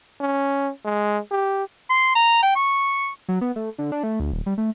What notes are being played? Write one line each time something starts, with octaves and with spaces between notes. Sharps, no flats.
C#4
G#3
G4
C6
A#5
G5
C#6
F#3
B3
A3
D3
D4
A3
D2
D#1
G3
A3